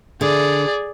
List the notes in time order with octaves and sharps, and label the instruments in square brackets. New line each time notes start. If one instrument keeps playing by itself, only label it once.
[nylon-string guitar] D3 [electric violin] G#4 D5